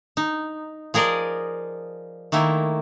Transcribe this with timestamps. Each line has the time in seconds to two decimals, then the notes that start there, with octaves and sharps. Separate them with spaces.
0.17 D#4
0.94 F3 G#4 A#4 D5 D#5
2.32 D#3 A3 A#3 E4